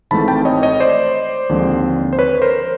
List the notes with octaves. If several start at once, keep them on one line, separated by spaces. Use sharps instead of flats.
G#1 G#2 E3 A3 C4 A5 B5
G5 A5
C#5 D#5
C#5 D#5
C5 D5
D#2 D3 F3 G#3 C4
C5
B4 C#5
A#4 C5